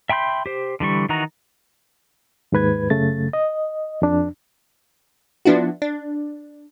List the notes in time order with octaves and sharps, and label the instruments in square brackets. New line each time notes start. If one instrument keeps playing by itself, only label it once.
[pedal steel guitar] E5 G5 B5 C6 G6
G4 C5
D3 E3 G3 C#6
D#3 E3 D#4 F#4 A#5
[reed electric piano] D#2 G#2 B4 G#6
F#2 C#3 A3 A6
D#5
F2 D4
[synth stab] F3 B3 D4 E4 F#4
D4